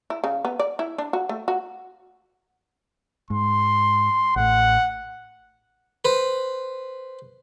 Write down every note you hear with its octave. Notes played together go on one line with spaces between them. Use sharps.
E4
C#3
B3
D5
E4
D4
F#4
A3
F#4
G#2 C6
A1 A2 F#5
B4 C5